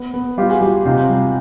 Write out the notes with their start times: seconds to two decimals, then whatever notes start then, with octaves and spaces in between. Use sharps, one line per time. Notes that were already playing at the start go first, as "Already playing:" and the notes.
Already playing: B3
0.14 B3
0.37 G3 F4 G4
0.50 F#4 G#4
0.61 G3 F4 G4
0.85 C3 D#4 F4
1.09 G3